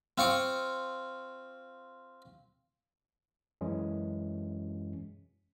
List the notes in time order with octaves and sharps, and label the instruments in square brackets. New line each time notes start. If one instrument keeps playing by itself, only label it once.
[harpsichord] C4 F4 C#6 D6
[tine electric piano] F#2 E3 G#3 C#4